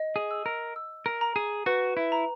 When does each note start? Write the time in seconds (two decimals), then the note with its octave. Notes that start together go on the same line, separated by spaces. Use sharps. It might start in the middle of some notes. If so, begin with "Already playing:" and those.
Already playing: D#5
0.16 G#4
0.31 E6
0.46 A#4
0.76 E6
1.06 A#4
1.21 A#5
1.36 G#4
1.66 F#4 B4
1.97 E4
2.12 A#5